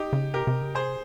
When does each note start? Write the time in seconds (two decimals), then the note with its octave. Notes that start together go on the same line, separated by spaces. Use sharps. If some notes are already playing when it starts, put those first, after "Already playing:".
Already playing: D#4 G4
0.13 C#3
0.34 C3 G4 A#4
0.47 C3
0.61 C#3
0.75 C3 G#4 C5